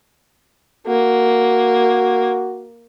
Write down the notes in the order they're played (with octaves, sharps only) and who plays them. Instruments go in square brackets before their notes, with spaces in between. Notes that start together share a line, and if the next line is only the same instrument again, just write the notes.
[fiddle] A#3 [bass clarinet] F#4